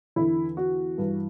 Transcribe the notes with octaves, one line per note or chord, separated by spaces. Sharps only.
E2 D3 E4
F#4
G2 E3